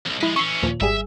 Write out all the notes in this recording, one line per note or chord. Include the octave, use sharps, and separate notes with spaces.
B1 F2
F3 G#3 E4 B6
E3 C#4 C#6 E6 C7
D#2 A#2 F3
G#1 G3 G#4 E5